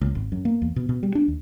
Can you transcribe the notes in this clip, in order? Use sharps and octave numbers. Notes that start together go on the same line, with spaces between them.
C#2
G#1
F#2
A#3
E2
B2
B2
G3
D4
D#2